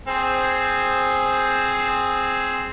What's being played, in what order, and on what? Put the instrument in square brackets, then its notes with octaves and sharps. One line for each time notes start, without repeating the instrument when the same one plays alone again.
[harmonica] C4 G#4 C5